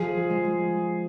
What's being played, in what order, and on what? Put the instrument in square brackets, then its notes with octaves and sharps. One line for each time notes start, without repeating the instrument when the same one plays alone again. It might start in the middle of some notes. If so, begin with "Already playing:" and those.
Already playing: [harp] F3 [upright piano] G#4
[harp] G#3